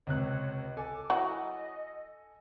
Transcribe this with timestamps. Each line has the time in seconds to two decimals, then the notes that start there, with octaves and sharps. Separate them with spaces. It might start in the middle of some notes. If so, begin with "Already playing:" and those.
0.07 C#2 C3 C#5 F#6
0.77 A4 G#5 D6
1.10 F#3 E4 F#4 D#5